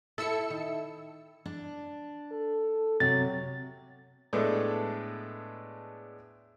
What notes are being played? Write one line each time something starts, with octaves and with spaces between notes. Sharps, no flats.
E4 A4 E5 E6 C#7
D#3
D4
A4
C3 F#3 A6
A2 G#3 B3 D4 A4